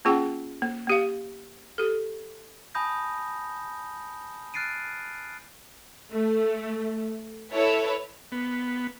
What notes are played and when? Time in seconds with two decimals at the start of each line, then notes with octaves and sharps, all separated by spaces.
0.05 A#3 C#4 F4 G#4 F#5 G5
0.62 A#3
0.87 A#3 G4 F5
1.78 G4 A4
2.75 G#5 A5 B5 D#6 G6 A#6
4.54 F6 F#6 A6 C7 D7 D#7
6.09 A3
7.53 E4 A4 B4 C#5
8.32 B3